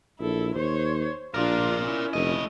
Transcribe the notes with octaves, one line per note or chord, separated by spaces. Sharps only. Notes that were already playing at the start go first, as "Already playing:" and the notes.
A#1 E4 A4
D#2 C5 C#5
A#1 D4 F4 A#4 D5
C#4 E4
F1 A3 D#5